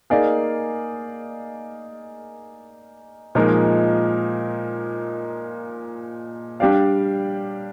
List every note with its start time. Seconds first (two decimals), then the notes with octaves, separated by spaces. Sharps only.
0.10 A#3 D#4 G#4 D5 F5
3.35 A#2 F3 G#3 D#4 A#4
6.60 G3 D4 G4 D5 F5